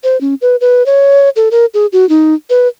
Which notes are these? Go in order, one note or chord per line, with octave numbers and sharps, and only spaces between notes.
C5
C#4
B4
B4
C#5
A4
A#4
G#4
F#4
D#4
B4